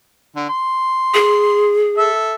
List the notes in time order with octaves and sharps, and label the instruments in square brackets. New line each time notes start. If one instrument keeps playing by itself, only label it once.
[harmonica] D3
C6
[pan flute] G#4
[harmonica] A4 E5